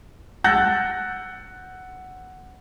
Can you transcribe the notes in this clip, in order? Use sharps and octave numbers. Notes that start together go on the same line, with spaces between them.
F#5 E6 F#6 G6 A6 A#6